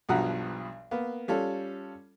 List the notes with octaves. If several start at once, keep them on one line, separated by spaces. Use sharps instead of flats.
B1 G2 B2 F3 F#5 A#5
A#3 B3
G3 C#4 F4 A4